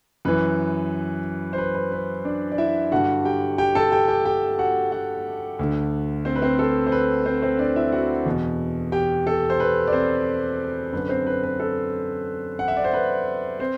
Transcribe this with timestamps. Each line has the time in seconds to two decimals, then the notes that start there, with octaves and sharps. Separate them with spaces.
0.25 F#2 E3 B4
1.53 C5
1.58 B4
1.75 B4
1.92 B4
2.25 D4 D5
2.52 D5
2.58 E4 E5
2.91 G2 D3 F#4 F#5
3.25 G4 G5
3.58 G4 G5
3.75 A4 A5
3.92 G4 G5
4.08 G4 G5
4.25 G4 G5
4.59 F#4 F#5
4.92 F#4 F#5
5.59 D2 D3
6.25 C4 C5
6.35 B4
6.42 C4 C5
6.59 A4
6.87 C5
6.92 B4
7.26 C4 C5
7.42 C4 C5
7.59 D4 D5
7.76 E4 E5
7.92 F#4 F#5
8.26 E2 B2
8.92 G4 G5
9.27 A4
9.50 C5
9.60 B4
9.87 D5
9.92 C4 C5
10.93 F#2 D3 B4
11.09 C4 C5
11.27 B4
11.43 B4
11.60 A4
12.59 F#5
12.68 E5
12.77 D5
12.84 C5
12.93 B4
13.59 C4 C5